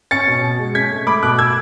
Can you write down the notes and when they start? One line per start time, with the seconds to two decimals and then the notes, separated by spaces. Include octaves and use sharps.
0.11 C#4 A6 C#7
0.27 B2
0.43 B2
0.59 G#3
0.75 C#4 G#6 B6
0.91 A3
1.07 A3 B5 D6
1.22 B2 D6 F#6
1.38 E6 G#6